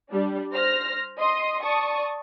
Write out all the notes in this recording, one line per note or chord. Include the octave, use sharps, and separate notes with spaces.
G3 D4
C5 F6 A#6
D#5 C6 D#6
D5 A5 C#6 D#6